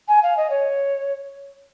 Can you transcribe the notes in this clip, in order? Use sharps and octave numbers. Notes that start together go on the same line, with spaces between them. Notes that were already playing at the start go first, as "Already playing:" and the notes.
G#5
F5
D#5
C#5